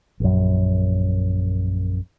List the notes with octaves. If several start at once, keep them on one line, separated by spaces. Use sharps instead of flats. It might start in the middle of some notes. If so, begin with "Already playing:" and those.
A#1 F#2